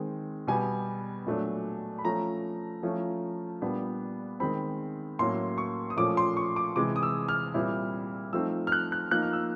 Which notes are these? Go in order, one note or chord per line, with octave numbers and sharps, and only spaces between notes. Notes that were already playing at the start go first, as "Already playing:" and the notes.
Already playing: D#3 G#3 C4
B2 G3 B3 G#5
A#2 F#3 A3 D4
B5
F3 A3 C#4 A#5
F3 A3 C#4 E4
A#2 G3 B3 D4
D#3 G#3 C4 B5
A2 F#3 A#3 C#4 C6
C#6
D#6
A#2 F3 A3 C#4 D6
C6
C#6
D6
C3 E3 G#3 D6
D#6
E6
F6
A#2 G3 C4 E4
F3 A3 C4 D#4 E6
F6
F#6
F#6
F3 A#3 D#4 F#6
F6
E6